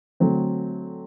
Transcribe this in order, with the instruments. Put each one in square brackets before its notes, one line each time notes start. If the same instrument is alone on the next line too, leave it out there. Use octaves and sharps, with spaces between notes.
[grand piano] D3 F#3 A3 C4